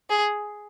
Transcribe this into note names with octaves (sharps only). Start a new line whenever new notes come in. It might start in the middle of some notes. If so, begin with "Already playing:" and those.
G#4